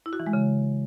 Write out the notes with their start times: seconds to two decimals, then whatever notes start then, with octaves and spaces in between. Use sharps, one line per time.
0.06 E4
0.13 F#4
0.20 E3
0.26 G#3
0.33 C#3